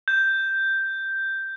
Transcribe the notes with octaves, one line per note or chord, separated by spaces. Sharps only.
G6